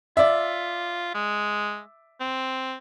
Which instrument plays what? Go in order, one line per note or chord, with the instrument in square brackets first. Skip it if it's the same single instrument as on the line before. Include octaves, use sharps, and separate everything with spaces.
[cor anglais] F4 [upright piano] D5 E5
[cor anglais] G#3
C4